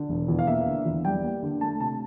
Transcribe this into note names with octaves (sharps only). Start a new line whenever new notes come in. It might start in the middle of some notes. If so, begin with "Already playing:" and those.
Already playing: D3
E1
E2
F5
A#3 E5
D3
E2
G3 G5
A#3
D3
A3 A5
C3 A5